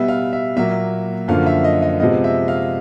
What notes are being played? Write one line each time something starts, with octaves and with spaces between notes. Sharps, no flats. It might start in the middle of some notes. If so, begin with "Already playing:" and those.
Already playing: B2 G3 B3 E5
F5
E5
A#2 F#3 A#3 E5
F#2 D3 F3 A#3 F5
E5
D#5
D#5
C3 F3 G#3 B3 D#5
E5
F5